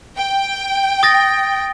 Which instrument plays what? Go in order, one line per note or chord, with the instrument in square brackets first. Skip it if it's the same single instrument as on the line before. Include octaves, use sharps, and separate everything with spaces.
[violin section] G5
[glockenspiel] D#6 A6 A#6